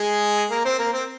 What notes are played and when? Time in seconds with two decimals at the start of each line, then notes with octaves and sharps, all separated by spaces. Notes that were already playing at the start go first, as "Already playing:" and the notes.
Already playing: G#3 G#4
0.50 A#3 A#4
0.65 C4 C5
0.79 A#3 A#4
0.93 C4 C5